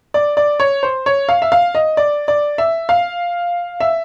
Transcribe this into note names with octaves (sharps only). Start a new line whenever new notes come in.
D5
D5
C#5
C5
C#5
F5
E5
F5
D#5
D5
D5
E5
F5
E5